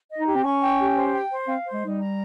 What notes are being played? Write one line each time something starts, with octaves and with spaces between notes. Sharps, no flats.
D#5
D#4
G4
C4
C#4 C#6
G5
G4
C5
G5
C5
C4 F5
C5
G#3
G3 D#4
A#5